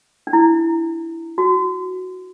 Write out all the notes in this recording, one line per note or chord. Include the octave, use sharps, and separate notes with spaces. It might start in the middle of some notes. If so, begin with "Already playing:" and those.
D4
E4
F#4